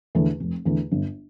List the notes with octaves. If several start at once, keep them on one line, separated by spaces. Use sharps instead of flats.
E2 D3 A3
F1
E2 D3 A3
G1